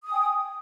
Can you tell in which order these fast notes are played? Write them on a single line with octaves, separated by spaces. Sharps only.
D#6 G#5 G5